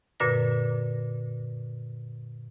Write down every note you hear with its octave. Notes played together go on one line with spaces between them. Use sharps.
F#2 A#2 D3 B4 A#6